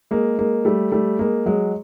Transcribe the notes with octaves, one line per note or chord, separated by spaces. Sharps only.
G#3 A#3
G#3 A#3
G3 A3
G3 A3
G#3 A#3
F#3 G#3